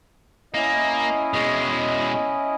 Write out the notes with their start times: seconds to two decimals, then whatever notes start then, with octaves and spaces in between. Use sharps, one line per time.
0.54 A#3 C#4 E4 D#5
1.33 B2 G#3